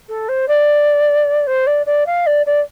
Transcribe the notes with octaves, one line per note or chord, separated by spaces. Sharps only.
A4
C5
D5
C5
D5
D5
F5
D5
D5